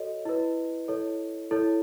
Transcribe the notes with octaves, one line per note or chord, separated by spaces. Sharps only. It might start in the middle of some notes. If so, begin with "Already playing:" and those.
Already playing: F#4 A4 C#5 D#5
E4 B4
E4 A4 C#5
E4 A4 C#5